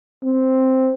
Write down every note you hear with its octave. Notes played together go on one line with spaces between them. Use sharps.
C4